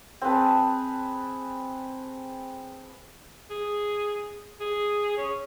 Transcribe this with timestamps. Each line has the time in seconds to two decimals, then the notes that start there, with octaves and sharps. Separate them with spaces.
0.22 C4 G#4 B4 A5
3.50 G#4
4.60 G#4
5.17 C#4